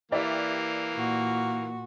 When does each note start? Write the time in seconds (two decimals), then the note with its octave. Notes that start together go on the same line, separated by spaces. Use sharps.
0.11 E3 A#3 G4 D5 E5
0.94 A#2 F#4